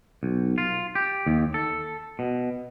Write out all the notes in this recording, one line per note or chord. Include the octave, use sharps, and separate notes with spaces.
B1
F4
G4
D#2
A4
B2